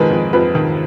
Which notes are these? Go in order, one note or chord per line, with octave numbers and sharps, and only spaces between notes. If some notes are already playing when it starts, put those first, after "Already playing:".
Already playing: F2 D#3 G#3 A#4 B4
F2
F2 B4
D#3